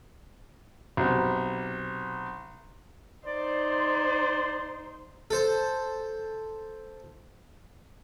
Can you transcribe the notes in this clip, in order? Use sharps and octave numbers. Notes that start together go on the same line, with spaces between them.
B1 C3
D#4 C5 D5
A4 C5